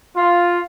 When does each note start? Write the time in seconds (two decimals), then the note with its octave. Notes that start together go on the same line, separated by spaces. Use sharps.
0.16 F4